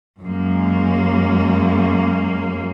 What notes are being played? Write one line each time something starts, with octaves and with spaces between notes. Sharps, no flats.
F#2 G#3 A#3